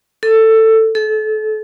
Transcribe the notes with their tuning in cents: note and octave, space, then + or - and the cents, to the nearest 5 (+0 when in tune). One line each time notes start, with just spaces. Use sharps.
A4 +15
A4 -30